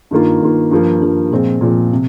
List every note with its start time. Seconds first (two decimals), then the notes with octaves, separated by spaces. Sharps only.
0.11 G2 D#3 A#3 F4
0.41 G2 D#3 A#3 F4
0.71 G2 F3 A#3
1.01 G2 F3 A#3
1.31 A#2 F3 G#3 C4
1.61 A#2 F3 G#3 C4
1.93 C3